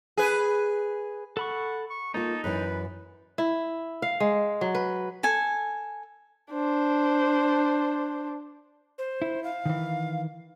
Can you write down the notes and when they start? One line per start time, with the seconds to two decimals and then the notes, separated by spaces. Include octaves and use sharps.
0.17 G#4 B4
1.37 A4 F#5 B5 C#6
1.90 C#6
2.14 A#3 D#4 F4 A4
2.44 F#2 E3 B4
3.38 E4
4.02 F5
4.20 G#3
4.61 F#3
4.75 B4
5.23 A4 G#5
6.52 D4 C5
8.98 C5
9.22 E4
9.44 F5
9.66 D#3 E3